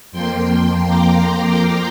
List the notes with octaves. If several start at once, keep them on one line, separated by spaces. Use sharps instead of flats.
F2 F3 A#3 G5 C6
A#5 D6
G5 C6